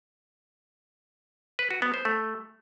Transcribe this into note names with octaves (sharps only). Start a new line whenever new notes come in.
B4
F#4
B3
C5
A3